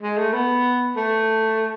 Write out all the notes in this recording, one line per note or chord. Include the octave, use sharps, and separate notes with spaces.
G#3
A3
B3
A3